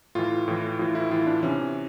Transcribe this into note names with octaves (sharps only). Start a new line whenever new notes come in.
A2 E3 F4
A2 E3
A2 E3 F4
E4
A2 E3 F4
D4
C3 E3 C#4